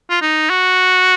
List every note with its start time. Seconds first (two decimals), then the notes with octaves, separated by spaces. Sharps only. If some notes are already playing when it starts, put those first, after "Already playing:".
0.10 F4
0.22 D#4
0.50 F#4